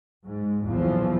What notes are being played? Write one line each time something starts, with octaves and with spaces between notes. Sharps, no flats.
G#2
B1 E2 A#2 E3 F3